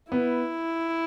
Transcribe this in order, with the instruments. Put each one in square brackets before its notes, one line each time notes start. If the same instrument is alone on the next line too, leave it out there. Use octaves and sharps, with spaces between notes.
[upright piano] B3 [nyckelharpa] E4